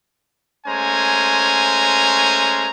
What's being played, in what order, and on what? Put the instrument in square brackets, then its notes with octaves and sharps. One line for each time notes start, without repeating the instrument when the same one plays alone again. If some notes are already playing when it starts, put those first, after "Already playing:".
[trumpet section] G#3 A3 C#4 C5 G#5 A#5